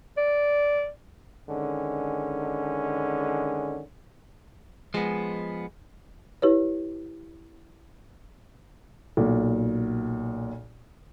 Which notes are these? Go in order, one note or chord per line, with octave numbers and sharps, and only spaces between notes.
D5
D3 D#3 G#3 C#4
F3 G#3 B3
E4 G4 B4 C#5
B1 A#2